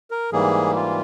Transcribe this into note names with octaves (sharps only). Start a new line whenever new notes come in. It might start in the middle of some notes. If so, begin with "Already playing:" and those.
A#4
G#2 E3 G3 A#3 G#4
F4